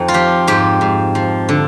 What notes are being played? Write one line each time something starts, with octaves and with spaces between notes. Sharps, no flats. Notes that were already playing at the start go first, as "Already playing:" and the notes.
Already playing: F2 C4 D#4
F4
F3 G4
G#2 G4
G#2
F3
D3